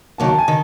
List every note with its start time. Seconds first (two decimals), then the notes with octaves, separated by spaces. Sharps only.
0.18 D#3 F#3 A#3 A5
0.29 A5
0.39 G#5
0.48 D#3